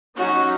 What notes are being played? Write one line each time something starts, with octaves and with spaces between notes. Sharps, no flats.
F#3 C#4 D#4 F#4